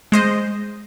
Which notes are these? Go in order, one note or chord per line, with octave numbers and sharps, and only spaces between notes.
G#3 C5 D#5